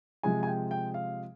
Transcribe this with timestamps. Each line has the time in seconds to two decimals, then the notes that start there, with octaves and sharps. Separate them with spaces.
0.23 C3 F3 G#3 G#5
0.43 G#5
0.47 G5
0.71 G5
0.94 F5